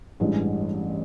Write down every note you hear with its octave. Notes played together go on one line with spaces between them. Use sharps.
A1 G2 E3 G#3